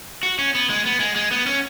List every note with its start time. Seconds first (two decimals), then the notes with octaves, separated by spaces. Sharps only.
0.23 F#4
0.39 C#4
0.55 B3
0.70 G#3
0.86 B3
1.00 G#3
1.16 G#3
1.31 B3
1.47 C#4